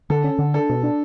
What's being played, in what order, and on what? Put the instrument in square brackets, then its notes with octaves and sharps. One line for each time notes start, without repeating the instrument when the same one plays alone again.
[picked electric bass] D3 [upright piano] A4
[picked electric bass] C#4
D3
[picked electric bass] D4 [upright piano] A4
[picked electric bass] B2
D4